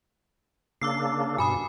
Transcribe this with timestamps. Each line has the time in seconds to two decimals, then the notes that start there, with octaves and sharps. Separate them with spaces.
0.82 C#3 A#3 D4 D6 E6 C7
1.38 G2 B2 G#5 B5 D#6